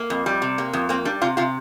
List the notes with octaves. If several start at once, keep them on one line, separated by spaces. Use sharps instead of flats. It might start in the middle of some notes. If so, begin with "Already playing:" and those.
Already playing: A#3
F2
G3
C3
A#3
F2
A#3 C4
G3 D4
C3 F4
C3 F4